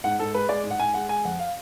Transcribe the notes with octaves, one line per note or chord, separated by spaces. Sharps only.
G#2 F#5
G#2 A4
G#3 B4
G#3 D5
G#2
F#5
G#2 G#5
G#3 F#5
G#3 G#5
F2 F#5
F5